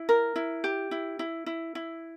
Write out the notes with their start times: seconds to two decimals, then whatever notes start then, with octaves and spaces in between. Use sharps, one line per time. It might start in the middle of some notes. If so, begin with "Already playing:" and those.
Already playing: E4
0.09 A#4
0.36 E4
0.64 G4
0.91 E4
1.19 E4
1.46 E4
1.75 E4